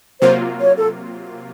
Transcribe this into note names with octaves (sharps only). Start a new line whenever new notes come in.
C3 F#3 A#3 F4 C5
C#5
A4